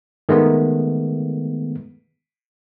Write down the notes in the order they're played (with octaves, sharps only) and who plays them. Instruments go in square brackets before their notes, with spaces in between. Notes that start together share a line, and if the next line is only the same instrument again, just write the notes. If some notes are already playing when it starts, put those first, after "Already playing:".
[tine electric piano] D#3 G#3 A3 B3